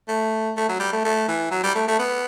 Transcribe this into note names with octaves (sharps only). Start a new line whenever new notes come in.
A3
A3
F#3
G3
A3
A3
E3
F#3
G3
A3
A3
B3